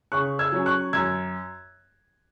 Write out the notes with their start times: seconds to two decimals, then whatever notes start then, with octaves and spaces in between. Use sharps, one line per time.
0.12 C#3 C#6 F#6
0.39 E6 G#6
0.52 F#3 C#4
0.66 C#6 F#6
0.93 F#2 E6 G#6